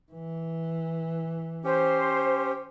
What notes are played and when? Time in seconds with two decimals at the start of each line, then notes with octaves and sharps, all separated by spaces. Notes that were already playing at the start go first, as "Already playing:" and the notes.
0.13 E3
1.64 C#4 G4 C5